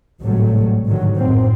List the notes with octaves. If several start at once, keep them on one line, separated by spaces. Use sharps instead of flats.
G#1 A2 C3 F#3 G3 A3
G#2 D3 D#3 F#3
F#2 A2 C4